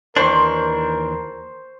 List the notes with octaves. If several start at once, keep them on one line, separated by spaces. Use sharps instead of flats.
D#2 E3 D4 A#4 C5 C6 C#6